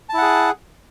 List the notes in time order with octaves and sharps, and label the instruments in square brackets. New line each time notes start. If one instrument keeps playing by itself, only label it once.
[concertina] A5
E4
F#5
G#4